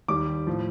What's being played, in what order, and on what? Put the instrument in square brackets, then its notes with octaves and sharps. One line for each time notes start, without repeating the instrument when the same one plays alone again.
[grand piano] D#2 D#3 G3 D6
A2 F3